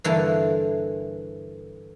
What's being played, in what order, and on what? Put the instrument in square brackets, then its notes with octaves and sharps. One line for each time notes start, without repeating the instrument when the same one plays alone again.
[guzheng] G2 D3 E3 A#3 A4 A#5